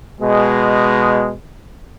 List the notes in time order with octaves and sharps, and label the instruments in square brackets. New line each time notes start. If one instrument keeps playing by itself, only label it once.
[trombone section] B2 G#3